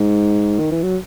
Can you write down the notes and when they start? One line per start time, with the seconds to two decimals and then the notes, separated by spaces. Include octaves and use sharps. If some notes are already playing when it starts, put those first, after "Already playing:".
Already playing: G#2
0.59 D#3
0.72 E3
0.83 F#3